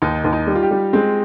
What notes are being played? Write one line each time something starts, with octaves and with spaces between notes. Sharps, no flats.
D#2 D#4
D#2
D#4
G3
F4
G4
G3
G#3 C4